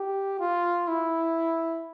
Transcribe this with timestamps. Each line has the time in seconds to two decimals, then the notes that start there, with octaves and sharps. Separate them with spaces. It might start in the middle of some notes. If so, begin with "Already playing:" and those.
Already playing: G4
0.40 F4
0.88 E4